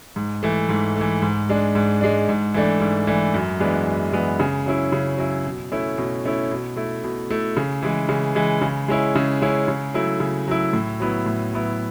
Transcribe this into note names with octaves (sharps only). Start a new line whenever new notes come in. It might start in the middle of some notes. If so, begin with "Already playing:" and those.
G#2
E3 A3
G#2
E3 A3
G#2
G#3 D4
G#2
G#3 D4
G#2
E3 A3 D4
G#2
E3 A3 D4
F#2
E3 G#3 B3 D4
F#2
E3 G#3 B3 D4
C#3
F#3 C#4 E4
C#3
F#3 C#4 E4
B2
A3 C#4 E4
B2
A3 C#4 E4
B2
A3 E4
B2
A3 E4
C#3
E3 G#3
C#3
E3 G#3
C#3
G#3 C#4 E4
C#3
G#3 C#4 E4
C#3
F#3 A3 E4
C#3
F#3 A3 E4
A2
F#3 B3 E4
A2
F#3 B3 E4